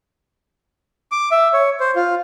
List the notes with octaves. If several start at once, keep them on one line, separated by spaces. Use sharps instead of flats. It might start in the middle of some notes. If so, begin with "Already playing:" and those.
D6
E5
C#5
C5
F4